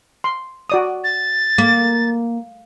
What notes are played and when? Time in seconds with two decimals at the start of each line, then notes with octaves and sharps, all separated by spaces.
0.24 C6
0.70 F#4 D5 D#6
1.04 A6
1.58 A#3